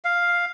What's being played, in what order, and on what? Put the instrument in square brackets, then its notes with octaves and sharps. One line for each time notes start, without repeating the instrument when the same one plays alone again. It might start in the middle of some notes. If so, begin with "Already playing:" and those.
[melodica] F5